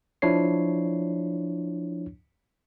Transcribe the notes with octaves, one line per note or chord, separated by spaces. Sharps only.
F3 D4 E4 C#5 C7